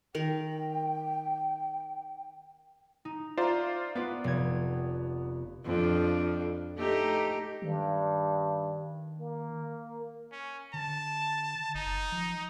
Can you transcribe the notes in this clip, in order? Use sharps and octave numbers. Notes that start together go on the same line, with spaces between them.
D#3 A#4 G5
D#4
F4 C5 D5 E5 A#5
B3 F4 B4 D5
F1 G#6
F2 D4
A3 D#4 G4
G2 D#3
A#3
C#4
D3 A5
F#1 D#4
F3